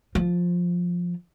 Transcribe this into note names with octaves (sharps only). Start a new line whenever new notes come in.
F3